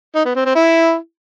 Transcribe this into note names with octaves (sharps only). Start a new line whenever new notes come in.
D#4
B3
C4
C4
E4